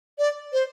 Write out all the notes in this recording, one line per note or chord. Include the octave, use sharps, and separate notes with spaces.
D5
C5